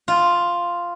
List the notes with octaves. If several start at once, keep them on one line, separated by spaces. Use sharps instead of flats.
F4